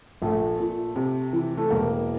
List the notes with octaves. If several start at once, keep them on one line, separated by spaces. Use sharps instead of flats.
A#1 A3
A#2
C3
E3
A3
E1 A#3